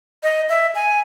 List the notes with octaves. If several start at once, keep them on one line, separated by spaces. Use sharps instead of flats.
D#5
E5
G#5